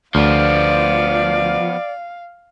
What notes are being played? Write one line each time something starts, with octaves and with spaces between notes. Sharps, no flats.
D2 F3 B3 D5 F5